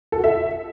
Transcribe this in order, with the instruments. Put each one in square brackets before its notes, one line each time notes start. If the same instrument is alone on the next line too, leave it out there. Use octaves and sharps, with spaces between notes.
[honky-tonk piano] A4
F#4
E5